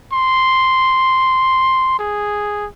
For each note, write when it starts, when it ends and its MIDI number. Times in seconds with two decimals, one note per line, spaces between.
0.13 1.94 84
1.99 2.67 68